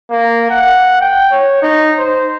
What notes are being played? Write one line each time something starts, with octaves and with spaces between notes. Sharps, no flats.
A#3
F#5
G5
C#5
D#4
C5